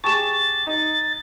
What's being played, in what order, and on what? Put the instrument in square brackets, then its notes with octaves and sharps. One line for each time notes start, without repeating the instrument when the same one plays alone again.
[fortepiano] G4 G#4 A5 [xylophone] C#6 E7 [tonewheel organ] A6
[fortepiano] D#4